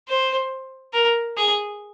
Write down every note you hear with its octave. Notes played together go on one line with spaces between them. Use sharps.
C5
A#4
G#4